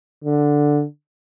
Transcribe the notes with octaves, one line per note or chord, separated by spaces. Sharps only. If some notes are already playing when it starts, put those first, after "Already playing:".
D3